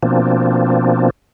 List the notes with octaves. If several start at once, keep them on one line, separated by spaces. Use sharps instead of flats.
B2 F3 A#3 C4 D4